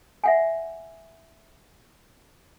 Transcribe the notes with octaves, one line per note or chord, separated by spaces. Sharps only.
E5 F#5 G#5